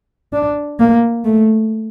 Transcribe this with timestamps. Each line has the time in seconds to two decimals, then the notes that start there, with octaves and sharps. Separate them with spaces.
0.33 D4
0.80 A#3
1.24 A3